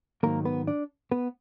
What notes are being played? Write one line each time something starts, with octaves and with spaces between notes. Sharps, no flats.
G#2 D#3 F#3 A#3 A#4
B3 B4
D4 D5
B3 B4